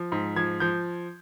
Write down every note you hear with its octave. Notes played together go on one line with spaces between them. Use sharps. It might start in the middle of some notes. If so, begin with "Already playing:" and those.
Already playing: F3
G#2
F3 G#6
F3 G6